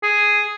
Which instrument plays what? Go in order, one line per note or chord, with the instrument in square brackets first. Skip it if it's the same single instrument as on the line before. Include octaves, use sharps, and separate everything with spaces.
[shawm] G#4